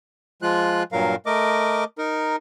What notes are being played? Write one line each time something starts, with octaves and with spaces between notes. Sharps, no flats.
F3 G#3 F4 F#6
G2 A#2 F#3 A#4 F5
A3 A#4 D#5 D6
D#4 A#4